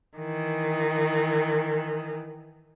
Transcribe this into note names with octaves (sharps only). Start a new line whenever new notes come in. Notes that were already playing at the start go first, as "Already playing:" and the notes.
D#3 E3